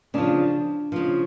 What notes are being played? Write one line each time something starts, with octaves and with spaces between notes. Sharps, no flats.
C#3 F3 D4
C#3 F3